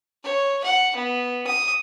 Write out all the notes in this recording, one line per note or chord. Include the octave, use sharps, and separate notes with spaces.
C#5
F#5
B3
D#6